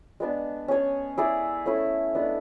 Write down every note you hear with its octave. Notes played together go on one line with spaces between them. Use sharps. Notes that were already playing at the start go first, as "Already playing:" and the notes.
G#3 B3 D4
C#4 G#4 C#5
E4 G#4 D5
A3 C#4 E4
G#3 B3 D4